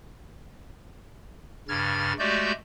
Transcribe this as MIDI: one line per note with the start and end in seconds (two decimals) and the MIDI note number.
1.69 2.13 43
1.69 2.13 49
1.69 2.13 89
1.69 2.13 92
1.69 2.13 93
2.19 2.52 56
2.19 2.52 57
2.19 2.52 66
2.19 2.52 67
2.19 2.52 74
2.19 2.52 91